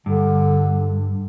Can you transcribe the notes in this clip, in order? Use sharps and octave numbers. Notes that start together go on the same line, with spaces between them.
G2 D3